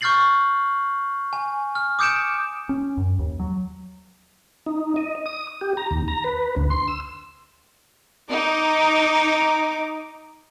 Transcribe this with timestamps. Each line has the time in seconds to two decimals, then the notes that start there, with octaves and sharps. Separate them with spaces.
0.01 C#6 F6 G6 A6 C7 F#7
1.33 G#5
1.75 F6
1.99 D6 D#6 G6 C#7 D7 E7
2.69 C#4
2.97 F#2
3.19 D#2
3.40 F#3
4.66 D#4
4.96 D#5
5.26 D#6
5.61 G4
5.77 A#5
5.91 D#2
6.08 A#5
6.24 B4
6.56 D2
6.70 C6
6.88 E6
8.29 D#4 D6